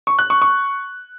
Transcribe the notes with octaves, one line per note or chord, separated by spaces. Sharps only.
C#6
F#6
C#6
C#6